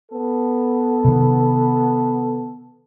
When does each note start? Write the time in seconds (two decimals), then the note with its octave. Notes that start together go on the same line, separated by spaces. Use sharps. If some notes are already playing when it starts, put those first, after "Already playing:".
0.11 B3 A4
1.05 C3 D#3